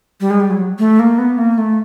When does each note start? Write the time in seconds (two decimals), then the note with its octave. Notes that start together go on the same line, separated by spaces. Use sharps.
0.21 G3
0.30 G#3
0.40 G3
0.50 F#3
0.79 A3
0.99 A#3
1.18 B3
1.38 A#3
1.58 A3